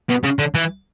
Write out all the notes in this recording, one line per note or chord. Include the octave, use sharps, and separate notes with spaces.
B2
C#3
D3
E3